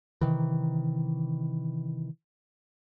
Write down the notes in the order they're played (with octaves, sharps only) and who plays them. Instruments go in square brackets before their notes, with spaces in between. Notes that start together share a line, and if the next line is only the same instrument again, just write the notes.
[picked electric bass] C3 D#3 E3